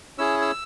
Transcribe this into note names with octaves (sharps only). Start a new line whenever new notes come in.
C#4 E4 G#4 E6
E6